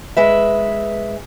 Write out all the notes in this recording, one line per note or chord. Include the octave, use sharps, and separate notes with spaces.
G#3 B4 E5